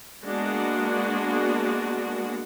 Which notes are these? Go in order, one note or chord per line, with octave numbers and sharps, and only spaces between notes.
G#3 A#3 B3 D4 F#4